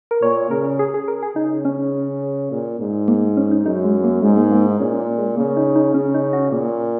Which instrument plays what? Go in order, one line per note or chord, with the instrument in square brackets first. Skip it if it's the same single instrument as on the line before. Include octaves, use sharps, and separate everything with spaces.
[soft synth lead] A#4
[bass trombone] A#2 [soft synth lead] C#5
[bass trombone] C#3 [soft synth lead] A#4
[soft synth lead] G#4
G#4
A#4
G#4
[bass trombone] C#3 [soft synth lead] D#4
[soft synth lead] C#4
[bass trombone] A#2
G#2
[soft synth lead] A#3
C#4
D#4
[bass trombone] F#2 [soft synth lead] D#4
[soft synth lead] G#3
A#3
[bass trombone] G#2 [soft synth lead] G#3
[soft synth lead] A#3
A#3
D#4
[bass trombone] A#2 [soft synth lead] C#4
[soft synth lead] A#3
G#3
[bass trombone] C#3 [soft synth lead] A#3
[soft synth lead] D#4
D#4
[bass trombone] C#3 [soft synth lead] C#4
[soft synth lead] D#4
F#4
[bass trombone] A#2 [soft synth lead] A#3